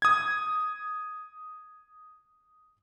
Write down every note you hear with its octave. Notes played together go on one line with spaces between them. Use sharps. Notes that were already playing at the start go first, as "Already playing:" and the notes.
D#6 G#6